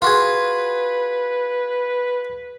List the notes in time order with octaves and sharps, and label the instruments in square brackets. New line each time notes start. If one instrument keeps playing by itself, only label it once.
[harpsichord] F4 F#4 G#4 [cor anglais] B4